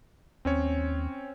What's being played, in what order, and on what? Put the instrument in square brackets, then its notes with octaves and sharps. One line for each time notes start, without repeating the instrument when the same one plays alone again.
[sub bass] D#2 [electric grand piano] C4 C#4 C#5